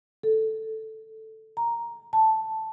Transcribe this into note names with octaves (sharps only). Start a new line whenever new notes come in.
A4
A#5
A5